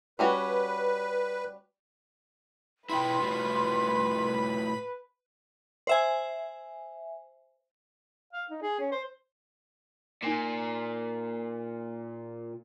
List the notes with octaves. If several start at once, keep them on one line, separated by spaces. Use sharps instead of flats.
G3 C#4 F#4 B4
E4 F4 B4 G5 B5 C6
A2 F4 F#4
C5 E5 G#5
F5
D#4
G#4
C#4
C5
A#2 D#4 G#5 E7